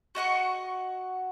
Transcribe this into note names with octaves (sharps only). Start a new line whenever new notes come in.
F#4 D#5 F#5 C#6